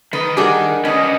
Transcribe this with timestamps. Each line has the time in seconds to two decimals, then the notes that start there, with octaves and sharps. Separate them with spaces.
0.13 D#3 B4 D#5
0.37 G3 D4 G4 G#4 A#4 F#5
0.85 C#4 D4 B4 D#5